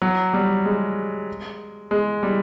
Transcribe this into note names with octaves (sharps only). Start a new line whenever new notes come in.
F#3
G3
G#3
G#3
G3